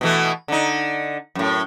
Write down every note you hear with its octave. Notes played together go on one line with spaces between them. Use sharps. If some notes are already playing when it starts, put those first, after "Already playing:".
B2 E3 A3
D3 D#4
F#2 A2